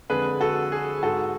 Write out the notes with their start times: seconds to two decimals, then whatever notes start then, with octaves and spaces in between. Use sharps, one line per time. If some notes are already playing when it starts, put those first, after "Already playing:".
0.10 F2 D3 G#3 G#4 B4
0.41 F#4 A4
0.72 G#4
1.03 G#2 G#3 F#4 A4